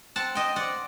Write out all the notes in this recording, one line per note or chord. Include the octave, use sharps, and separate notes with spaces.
C4 F#5 A5
C4 D#5 G5
C4 D5 F#5